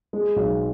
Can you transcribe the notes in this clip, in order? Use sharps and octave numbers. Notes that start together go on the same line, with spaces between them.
G#3
B1